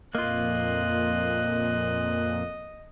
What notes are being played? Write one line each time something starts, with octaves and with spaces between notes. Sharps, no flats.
F2 A#2 A#3 F4 D#5 F#6